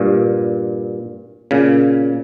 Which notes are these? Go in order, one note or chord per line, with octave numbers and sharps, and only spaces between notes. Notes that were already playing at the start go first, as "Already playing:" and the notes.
Already playing: G2 A#2
A#2 C#3